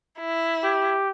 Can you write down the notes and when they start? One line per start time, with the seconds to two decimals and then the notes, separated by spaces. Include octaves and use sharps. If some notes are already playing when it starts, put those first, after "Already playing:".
0.20 E4
0.64 G4